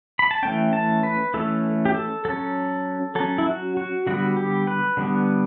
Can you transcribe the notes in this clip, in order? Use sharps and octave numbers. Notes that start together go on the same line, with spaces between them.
B5
A5
E3 A3 C#4 G5
A5
B4
E3 A3 C#4 A4
G4
A4
F#3 C#4 A4
F#3 C#4 A4
E4
F#4
F#4
D3 G3 B3 F#4
G4
B4
D3 G3 B3